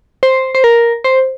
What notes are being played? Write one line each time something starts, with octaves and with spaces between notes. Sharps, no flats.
C5
C5
A#4
C5